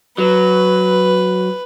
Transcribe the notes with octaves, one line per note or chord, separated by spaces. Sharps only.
F#3 B4